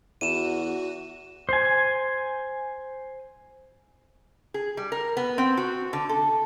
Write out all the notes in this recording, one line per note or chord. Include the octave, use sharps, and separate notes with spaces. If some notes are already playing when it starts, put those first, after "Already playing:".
E2 F#4 D#7 E7
C5 G#5
G#4
G3
A#4
B3
C4
F#4
D3
A4